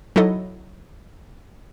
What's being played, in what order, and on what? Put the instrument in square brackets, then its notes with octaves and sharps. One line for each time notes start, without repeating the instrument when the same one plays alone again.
[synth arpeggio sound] F#3 D#4 E4 A4 D#5